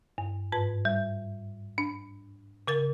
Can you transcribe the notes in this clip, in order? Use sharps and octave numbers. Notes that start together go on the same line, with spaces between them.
G2
G#2 B4
G3
D4
C#3 A#4 A6